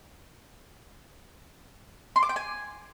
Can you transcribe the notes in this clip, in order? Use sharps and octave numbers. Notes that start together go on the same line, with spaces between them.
C6
D6
G5
G#5